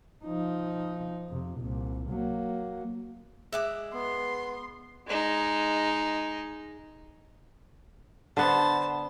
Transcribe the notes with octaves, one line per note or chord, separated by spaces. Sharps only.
F3 D#4
F2 C3
C2 A#2
F#3 A#3
G#3 E5 F#5 D6
B3 C6
G#3 D#4
D3 B3 C5 A5